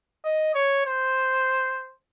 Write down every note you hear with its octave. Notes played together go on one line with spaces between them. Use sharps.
D#5
C#5
C5